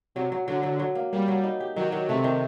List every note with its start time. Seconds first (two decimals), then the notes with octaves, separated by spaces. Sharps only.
0.15 C3 F#3
0.32 F#3
0.48 D3 F#3
0.63 F#3
0.79 F#3
0.95 A#3
1.12 G3 A#3
1.28 F#3
1.44 D#4
1.60 G4
1.76 D#3 F#3
1.92 D#3
2.09 C3 A3
2.24 D#3